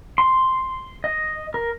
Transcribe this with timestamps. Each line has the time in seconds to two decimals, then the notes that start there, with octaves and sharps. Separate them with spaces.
0.18 C6
1.04 D#5
1.54 A#4